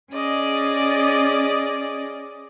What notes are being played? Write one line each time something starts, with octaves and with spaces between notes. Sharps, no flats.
C#4 G#4 D5 D#5